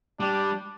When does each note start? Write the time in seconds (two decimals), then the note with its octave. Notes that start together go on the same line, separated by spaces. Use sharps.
0.20 G3 D4